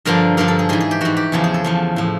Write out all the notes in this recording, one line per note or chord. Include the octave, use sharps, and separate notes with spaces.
G2 D3 F3 A#4
G2 D3 F3 A#4
A4
G#4
G#2 E3 G#4
G#4
G4
G#2 E3 F#4
G4
E2 C#3 F3 G#4
G#4
A4
E2 C#3 F3
A2 F3